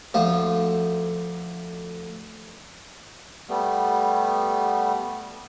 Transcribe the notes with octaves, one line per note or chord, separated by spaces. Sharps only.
D2 F3
G3 A3 B3